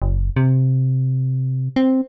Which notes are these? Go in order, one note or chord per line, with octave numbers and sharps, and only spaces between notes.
F#1
C3
C4